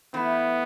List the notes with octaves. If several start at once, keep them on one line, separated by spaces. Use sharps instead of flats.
E3 A3 B3 E4